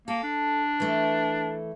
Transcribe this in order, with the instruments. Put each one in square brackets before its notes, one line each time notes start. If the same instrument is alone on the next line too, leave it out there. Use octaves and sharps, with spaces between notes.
[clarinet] A#3 [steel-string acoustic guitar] A4
[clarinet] D4
[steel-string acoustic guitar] E3 A3